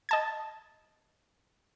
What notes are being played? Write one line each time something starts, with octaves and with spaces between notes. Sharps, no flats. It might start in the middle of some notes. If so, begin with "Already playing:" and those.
D#5 A5 G#6